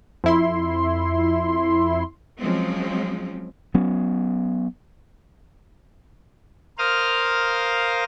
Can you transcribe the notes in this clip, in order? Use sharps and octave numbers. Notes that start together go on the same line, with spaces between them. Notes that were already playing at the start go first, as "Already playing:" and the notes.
F2 E4 C6
F3 F#3 G#3 C4 C#4
F#3 B3 C#4
A#4 C5 F5 D#6 F6